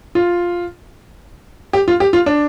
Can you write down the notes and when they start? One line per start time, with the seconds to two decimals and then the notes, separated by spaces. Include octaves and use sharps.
0.15 F4
1.73 G4
1.88 F4
2.00 G4
2.13 F4
2.26 D4